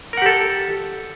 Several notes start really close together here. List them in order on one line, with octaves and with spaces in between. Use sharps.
A#4 F#5 G4 A4